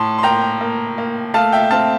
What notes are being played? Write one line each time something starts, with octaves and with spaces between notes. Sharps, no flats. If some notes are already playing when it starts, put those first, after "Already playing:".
Already playing: A2 A5 C6
C6
A#3 G5 A#5
A#3
A#3
A3 F5 A5
E5 G5
C4 F5 A5